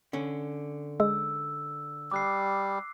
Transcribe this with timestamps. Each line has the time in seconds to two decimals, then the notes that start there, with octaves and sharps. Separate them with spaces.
0.13 D3 C#4
1.00 G#3 E6
2.12 G3 D6 F#6 C7